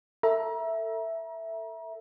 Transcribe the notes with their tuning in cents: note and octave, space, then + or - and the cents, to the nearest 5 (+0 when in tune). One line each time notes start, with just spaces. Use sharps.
A4 +30 E5 +0 A#5 +30